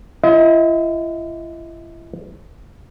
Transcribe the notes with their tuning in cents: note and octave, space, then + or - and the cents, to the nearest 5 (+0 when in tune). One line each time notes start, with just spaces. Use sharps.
E4 +45 D#5 +40